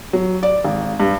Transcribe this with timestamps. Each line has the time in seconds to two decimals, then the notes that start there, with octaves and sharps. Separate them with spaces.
0.13 F#3
0.43 D5
0.65 G#1
1.00 G2